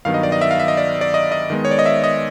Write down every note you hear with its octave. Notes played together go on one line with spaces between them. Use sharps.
G2 D#3 F#3 B3 F5
D#5
D5
D#5
E5
F5
E5
D#5
D5
D5
D#5
D#5
D#3 G#3 B3
C#5
D5
D#5
E5
D#5